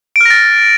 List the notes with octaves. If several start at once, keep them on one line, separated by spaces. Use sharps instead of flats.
F6 A6 A#6 D7